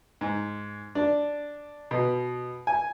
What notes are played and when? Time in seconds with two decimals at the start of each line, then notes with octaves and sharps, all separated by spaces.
0.21 G#2
0.95 D4
1.91 B2
2.67 G#5